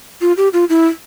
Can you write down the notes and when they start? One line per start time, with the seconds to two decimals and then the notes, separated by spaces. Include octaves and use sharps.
0.21 F4
0.37 G4
0.53 F4
0.69 E4